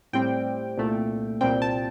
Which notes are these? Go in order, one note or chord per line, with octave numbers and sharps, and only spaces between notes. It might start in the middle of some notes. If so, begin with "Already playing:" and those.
A2 G3 C4 G5
C2 A#2 A3
C2 A#2 G3 C4 G5
A5